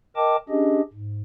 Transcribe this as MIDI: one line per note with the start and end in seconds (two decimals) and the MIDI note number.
0.16 0.36 70
0.16 0.36 75
0.16 0.36 79
0.16 0.36 81
0.16 0.36 86
0.49 0.81 61
0.49 0.81 62
0.49 0.81 67
0.49 0.81 68
0.49 0.81 75
0.93 1.22 44